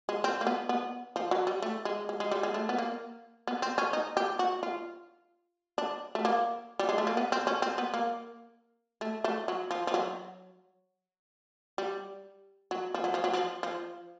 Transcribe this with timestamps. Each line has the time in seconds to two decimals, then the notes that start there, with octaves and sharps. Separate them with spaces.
0.09 G#3
0.24 C4
0.41 A#3
0.47 B3
0.69 B3
1.16 F3
1.31 F#3
1.47 G3
1.62 A3
1.85 G#3
2.09 G#3
2.20 G#3
2.31 G3
2.43 G#3
2.54 A3
2.69 B3
2.78 A#3
3.47 B3
3.62 C4
3.78 C#4
3.93 D#4
4.17 G4
4.39 F#4
4.63 F4
5.78 D4
6.15 A3
6.25 A#3
6.79 G3
6.89 G#3
6.98 A3
7.07 A#3
7.17 B3
7.32 C4
7.47 C#4
7.62 C4
7.78 B3
7.94 A#3
9.01 A3
9.24 A3
9.48 F#3
9.71 F3
9.87 F3
9.94 F#3
11.78 G3
12.71 F#3
12.94 F3
13.04 F#3
13.14 F3
13.24 F#3
13.33 F3
13.63 F3